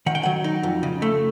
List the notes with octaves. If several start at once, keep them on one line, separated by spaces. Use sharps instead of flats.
D#3 F#5
G5
F#3 F#5
D#4
F2
C#3
A3